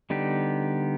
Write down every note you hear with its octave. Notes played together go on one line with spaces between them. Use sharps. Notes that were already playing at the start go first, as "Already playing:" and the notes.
D3 G3 B3 D#4 G4